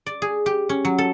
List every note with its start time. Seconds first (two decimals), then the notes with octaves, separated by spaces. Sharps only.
0.06 D5
0.22 G#4
0.46 G4
0.69 C#4
0.85 F#3
0.98 A4